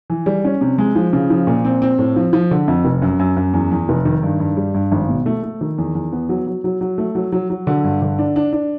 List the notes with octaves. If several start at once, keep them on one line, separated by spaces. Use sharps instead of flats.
E3
G3
C#4
C3
G#3
F3
C#3
F3
A#2
C4
C4
A2
F3
F3
D3
F2
F1
F#2
F#2
F#2
E2
E2
F1
D#3
G2
G2
G3
G2
G#1
B2
A3
A3
D#3
E2
E2
B3
F#3
F#3
F#3
F#3
A3
F#3
F#3
F#3
D3
G2
D3
D4
D4
D4